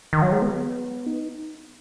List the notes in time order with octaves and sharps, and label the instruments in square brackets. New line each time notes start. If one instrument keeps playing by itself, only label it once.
[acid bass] D#3
F#3
G#3
B3
D#4